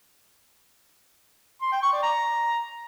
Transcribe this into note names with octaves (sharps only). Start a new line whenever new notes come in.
C6
G5
C#6
D5
A#5